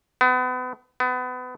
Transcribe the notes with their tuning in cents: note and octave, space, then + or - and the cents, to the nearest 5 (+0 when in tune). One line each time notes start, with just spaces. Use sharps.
B3 +35
B3 +30